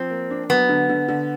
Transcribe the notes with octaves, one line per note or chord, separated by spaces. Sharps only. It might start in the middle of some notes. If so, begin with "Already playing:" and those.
Already playing: F3 C4
A#3
D4
F#3 B3
D3
D3
D3